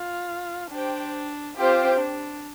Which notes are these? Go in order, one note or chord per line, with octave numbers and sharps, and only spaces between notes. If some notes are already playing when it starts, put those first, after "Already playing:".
Already playing: F4
D4 G4 C5 G5
C4 F4 G4 C5 G5
D4